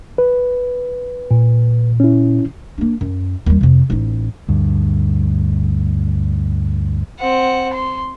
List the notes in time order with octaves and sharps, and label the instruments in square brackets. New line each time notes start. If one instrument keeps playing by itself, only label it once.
[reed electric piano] B4
[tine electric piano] A#2
[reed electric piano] C#4 E4
[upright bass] A#3 D4
F#2
D#2 G3
F2 C3
A1 D#4
[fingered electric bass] D2 G2
[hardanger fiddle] C4 F#5
C6